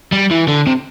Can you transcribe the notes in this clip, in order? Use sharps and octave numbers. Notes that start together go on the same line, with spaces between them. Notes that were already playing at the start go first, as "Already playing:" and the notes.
G3
E3
D3
C3